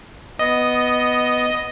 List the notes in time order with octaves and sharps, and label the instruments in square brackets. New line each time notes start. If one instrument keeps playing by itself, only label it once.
[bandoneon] B3 [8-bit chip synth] D#5